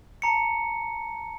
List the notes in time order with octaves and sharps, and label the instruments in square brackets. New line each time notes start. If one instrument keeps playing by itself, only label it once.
[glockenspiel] A5 A#5 C#7